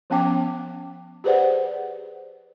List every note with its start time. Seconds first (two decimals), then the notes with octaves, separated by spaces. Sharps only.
0.10 F3 B3 C#4 G5 D6
1.24 G4 G#4 B4 C5 D5 F#5